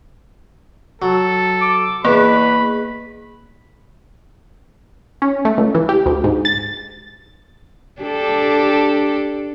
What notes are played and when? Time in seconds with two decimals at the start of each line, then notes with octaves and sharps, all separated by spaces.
1.02 F#3 A4
1.62 D6
2.05 E2 A#3 G#4 B4 B5
5.22 C#4
5.45 A3
5.58 C#2
5.75 E3
5.89 G4
6.06 D2
6.24 G#2
6.45 A6
8.02 D4 G4 A4